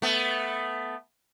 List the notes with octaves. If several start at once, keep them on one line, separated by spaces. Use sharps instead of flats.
A3 B3